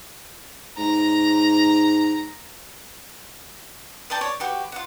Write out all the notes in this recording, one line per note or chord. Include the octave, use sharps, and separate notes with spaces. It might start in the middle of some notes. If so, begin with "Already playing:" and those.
G#2 A#5
B4 D5 G5 A5
C#5 D5
F#4 G4 B4
F4 F#5